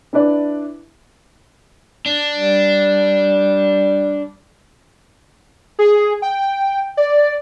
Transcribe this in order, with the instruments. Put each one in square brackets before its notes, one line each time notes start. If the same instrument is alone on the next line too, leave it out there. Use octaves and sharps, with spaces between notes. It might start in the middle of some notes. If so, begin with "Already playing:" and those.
[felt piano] D4 E4 B4 D5
[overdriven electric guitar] D4
[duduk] G3
[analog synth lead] G#4
G5
D5